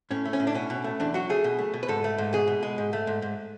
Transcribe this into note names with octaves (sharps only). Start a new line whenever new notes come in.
A2 C#4
A3
C#4
A2
D4
B2 C#4
B2
A3
E2 D4
F#3 F#4
A3 G#4
B2
A3
B2
B4
G#2 A4
A3
G#2
B2 G#4
B2
G#3
G#2
A3
G#2
G#2